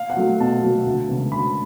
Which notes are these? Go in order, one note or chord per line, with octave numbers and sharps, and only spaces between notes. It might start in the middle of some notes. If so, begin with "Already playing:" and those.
Already playing: F5
F#5
F#3 A3
B2 A5
F#3 A3
D2
C#3 G#3 B3
D2 B5